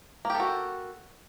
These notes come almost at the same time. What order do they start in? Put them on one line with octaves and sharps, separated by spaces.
A#3 G4 A4 F#4